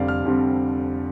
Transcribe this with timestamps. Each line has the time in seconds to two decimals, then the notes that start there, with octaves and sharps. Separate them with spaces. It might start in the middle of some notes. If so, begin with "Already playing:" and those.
Already playing: F1 F2 D3 G3 C4 D5 F5
0.08 F6
0.25 F1 F2 D3 G3 C4